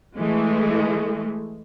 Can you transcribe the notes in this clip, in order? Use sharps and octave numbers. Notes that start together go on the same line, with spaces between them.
E3 G#3 A3